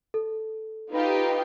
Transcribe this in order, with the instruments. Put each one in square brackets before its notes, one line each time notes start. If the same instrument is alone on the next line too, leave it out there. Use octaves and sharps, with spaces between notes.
[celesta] A4
[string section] D#4 F4 G4 [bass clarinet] B4